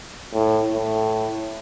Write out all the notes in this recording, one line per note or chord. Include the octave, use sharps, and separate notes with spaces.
A2
A2